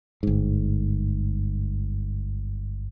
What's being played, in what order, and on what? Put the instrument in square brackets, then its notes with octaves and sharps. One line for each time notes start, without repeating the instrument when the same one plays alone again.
[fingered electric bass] G1 G#2